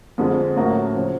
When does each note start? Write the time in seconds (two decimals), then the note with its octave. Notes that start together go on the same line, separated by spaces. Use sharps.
0.18 F2 D3 F3 G#3 C4
0.56 A2 F#3 A#3 C#4 F#4
0.95 C#3 F3